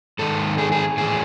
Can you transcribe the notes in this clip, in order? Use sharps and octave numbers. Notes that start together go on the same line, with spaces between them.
G#2 D#3 A4
G#4
G#4
A2 E3 G#4